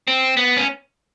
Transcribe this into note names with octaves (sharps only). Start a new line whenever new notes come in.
C4
B3
C#4